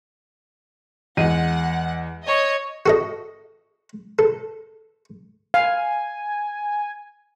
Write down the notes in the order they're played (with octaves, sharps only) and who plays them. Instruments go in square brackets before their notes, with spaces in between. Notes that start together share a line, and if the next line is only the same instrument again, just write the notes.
[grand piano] E2 G#3 D#7 [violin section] F#5
[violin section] C#5 D#5
[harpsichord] F#4 A4 D#5
A4
[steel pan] F5 [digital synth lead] G#5